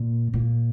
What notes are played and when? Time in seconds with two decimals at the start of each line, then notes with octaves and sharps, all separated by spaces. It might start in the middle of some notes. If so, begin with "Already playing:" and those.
Already playing: A#2
0.33 A#2